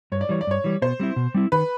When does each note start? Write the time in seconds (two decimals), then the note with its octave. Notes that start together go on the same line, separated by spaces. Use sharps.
0.12 G2 C#5
0.21 D5
0.29 E3 G3 C#5
0.41 D5
0.47 G2 C#5
0.64 E3 G3
0.82 B2 C5
1.00 G3 C4 E4
1.16 B2
1.34 G3 C4 E4
1.52 D#3 B4